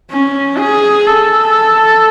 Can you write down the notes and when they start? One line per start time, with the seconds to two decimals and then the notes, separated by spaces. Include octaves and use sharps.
0.11 C#4
0.58 G#4
1.06 A4